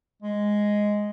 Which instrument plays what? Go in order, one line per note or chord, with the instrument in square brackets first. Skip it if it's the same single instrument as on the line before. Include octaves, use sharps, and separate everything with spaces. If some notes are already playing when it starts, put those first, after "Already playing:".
[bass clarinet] G#3